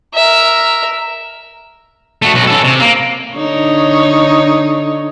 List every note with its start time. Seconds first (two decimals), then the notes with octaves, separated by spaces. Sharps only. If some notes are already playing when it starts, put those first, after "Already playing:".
0.15 A#4 E5
2.22 A3 F#4
2.34 B1 F#4
2.47 C#4 A4
2.64 C3
2.80 A#3
3.35 D3 D#4 C#5